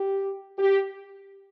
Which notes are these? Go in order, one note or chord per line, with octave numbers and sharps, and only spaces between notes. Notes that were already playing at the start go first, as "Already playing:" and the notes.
Already playing: G4
G4